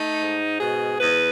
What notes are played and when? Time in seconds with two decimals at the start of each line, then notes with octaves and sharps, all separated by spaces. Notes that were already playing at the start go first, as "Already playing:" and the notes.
Already playing: A3 D#4
0.20 G#2
0.60 B2 G#4
1.00 E2 B4